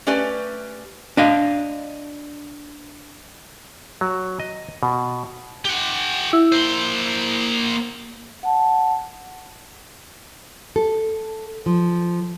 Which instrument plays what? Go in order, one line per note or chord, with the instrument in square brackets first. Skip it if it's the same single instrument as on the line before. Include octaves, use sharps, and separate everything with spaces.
[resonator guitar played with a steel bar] A3 C#4 G4 B4 D5
[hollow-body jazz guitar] D4 D#5 F5
[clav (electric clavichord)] F#3
D#5
B2
[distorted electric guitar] G4 F#5
[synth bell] E4
[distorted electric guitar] A#3 C5
[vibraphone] F#5 A5
[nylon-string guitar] A4
F3